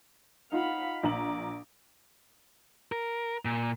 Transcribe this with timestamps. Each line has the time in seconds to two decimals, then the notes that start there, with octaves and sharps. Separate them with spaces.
0.52 D#4 F4 F5 F#5 B5
1.03 A#1 A#5 D6 F#7
2.92 A#4
3.45 A#2